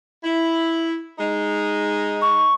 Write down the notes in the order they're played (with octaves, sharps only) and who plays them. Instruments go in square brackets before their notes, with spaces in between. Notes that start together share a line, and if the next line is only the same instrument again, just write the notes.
[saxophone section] E4
G#3 D#4
[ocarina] C#6